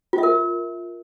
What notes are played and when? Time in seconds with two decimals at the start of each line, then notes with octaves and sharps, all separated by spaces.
0.13 F4
0.18 E5
0.23 A#4